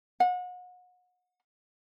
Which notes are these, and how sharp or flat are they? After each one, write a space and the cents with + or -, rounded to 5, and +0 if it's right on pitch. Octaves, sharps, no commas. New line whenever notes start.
F#5 -35